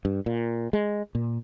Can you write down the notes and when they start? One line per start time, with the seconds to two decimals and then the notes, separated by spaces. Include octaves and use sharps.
0.05 G2
0.26 A#2
0.73 G#3
1.15 A#2